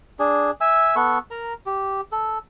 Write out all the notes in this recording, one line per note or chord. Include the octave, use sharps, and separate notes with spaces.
D4 G#4
E5 G#5 E6
B3 A4 C#6
A#4 A#5
G4
A4